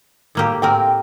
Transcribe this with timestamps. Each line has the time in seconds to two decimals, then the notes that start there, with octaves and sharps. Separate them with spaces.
0.35 A2 A#3 G4
0.62 A2 C4 A#4 G5 G#5